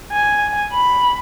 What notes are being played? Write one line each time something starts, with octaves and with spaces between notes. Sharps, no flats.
G#5
B5